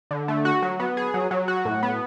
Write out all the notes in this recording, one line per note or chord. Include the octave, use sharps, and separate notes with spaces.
D3
A3
F#4
F#3
B3
G#4
F#3
F#3
F#4
A2
B3